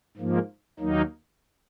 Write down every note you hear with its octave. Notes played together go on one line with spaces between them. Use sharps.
G#2 F3 A#3
D#2 D#3 F#3 A#3 D#4